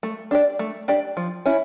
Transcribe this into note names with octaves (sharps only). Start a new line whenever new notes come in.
A3
D4 G4 D5
A3
D4 G4 D5
F3
C#4 E4